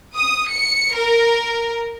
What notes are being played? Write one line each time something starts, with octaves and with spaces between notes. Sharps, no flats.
D#6
C#7
A#4